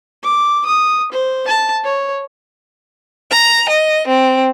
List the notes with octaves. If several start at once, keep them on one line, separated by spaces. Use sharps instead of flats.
D6
D#6
C5
A5
C#5
A#5
D#5
C4